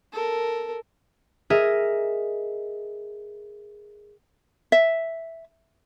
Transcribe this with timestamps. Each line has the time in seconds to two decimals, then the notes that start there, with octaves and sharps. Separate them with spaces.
0.12 A4 A#4
1.50 G#4 A#4 D#5 E5
4.72 E5